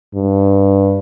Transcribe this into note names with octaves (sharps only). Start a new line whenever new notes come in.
G2